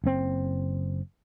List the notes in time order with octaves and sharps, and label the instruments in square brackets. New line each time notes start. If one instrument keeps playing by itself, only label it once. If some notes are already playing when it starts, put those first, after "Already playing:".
[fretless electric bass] F#1 C4